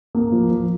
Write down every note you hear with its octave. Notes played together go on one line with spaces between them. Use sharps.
A#3
F3
F3